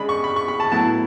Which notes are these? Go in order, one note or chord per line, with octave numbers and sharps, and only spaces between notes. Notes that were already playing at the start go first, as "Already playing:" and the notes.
Already playing: C#3 G#3 D4 B5
C#6
B5
C#6
B5
A5
A2 F#3 B3 E4 A5